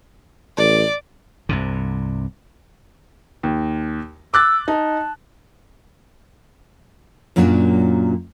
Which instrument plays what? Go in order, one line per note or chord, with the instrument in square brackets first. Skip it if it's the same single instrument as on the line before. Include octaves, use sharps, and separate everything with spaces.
[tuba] A1 [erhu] D5
[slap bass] C2 G2 C3
[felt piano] D#2
[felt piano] D6 F#6 A6 [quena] E6
[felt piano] D#4 [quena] A5
[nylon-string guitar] F#2 A#2 F#3 A#3 C#4 D4